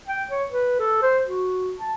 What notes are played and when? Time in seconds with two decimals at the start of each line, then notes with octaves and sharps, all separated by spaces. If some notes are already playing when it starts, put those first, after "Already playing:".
0.08 G5
0.31 C#5
0.49 B4
0.80 A4
1.02 C5
1.26 F#4
1.79 A5